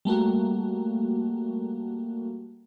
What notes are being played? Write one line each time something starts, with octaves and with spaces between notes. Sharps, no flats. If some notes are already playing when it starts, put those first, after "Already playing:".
G3 A3 A#3 F#4